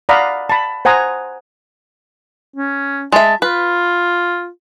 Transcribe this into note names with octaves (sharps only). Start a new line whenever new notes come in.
D5 F5 F#5 A#5 B5 D#6
A5 B5
C5 F#5 G#5 A#5 D#6
C#4
G#3 E5 A5
F4 B4